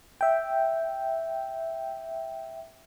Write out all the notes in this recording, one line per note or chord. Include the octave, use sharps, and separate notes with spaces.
E5 G5